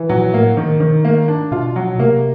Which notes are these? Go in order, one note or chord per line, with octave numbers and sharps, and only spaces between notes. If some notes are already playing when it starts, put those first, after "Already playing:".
Already playing: E3
A#2 F#3
A2 A#3
D#3
D#3
A#3
D4
B2 F4
F#3
C3 A#3